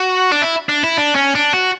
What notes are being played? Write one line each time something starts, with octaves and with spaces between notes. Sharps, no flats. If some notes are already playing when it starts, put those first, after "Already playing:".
Already playing: F#4
D4
E4
D4
E4
D4
C#4
D4
F#4